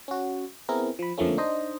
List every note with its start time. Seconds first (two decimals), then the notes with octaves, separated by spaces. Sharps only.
0.08 C#4 F#4
0.69 B3 C4 E4 G#4 A#4
0.99 F3 B5
1.18 F2 D3 F3 A3 A#3 C#4
1.38 D4 D#4 C5 D#5